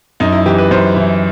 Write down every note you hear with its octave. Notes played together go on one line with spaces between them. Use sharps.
F#2 D#4
E4
E3 G4
B4
F#2 C5
E3